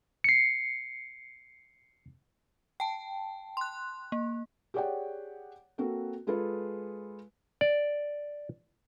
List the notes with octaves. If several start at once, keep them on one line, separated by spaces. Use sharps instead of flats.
C7 C#7
G5 A5
C6 F#6
A#3
G4 G#4 C#5 D5 F#5 G5
A#3 C4 F#4 A4
G#3 F4 G#4 A4 B4
D5